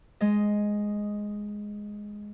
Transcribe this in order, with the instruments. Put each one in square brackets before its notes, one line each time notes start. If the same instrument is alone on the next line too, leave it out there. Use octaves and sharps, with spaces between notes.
[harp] G#3 D#5